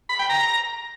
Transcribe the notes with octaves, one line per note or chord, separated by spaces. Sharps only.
B5
G5
A#5